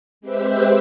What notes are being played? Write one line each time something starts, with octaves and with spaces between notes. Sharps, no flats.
G#3 C4 G4 B4 C5 E5